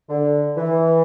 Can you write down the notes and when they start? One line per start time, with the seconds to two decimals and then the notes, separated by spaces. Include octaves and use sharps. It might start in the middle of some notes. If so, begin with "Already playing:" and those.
0.09 D3
0.57 E3